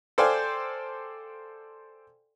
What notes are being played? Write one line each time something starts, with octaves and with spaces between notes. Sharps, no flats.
A4 C5 D5 F5 G5 G#5